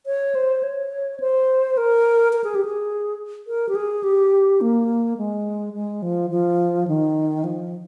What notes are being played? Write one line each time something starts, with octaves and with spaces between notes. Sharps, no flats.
C#5
C5
C#5
C5
A#4
A#4
G#4
G4
G#4
A#4
G4
G#4
G4
A#3
G#3
G#3
F3
F3
D#3
F3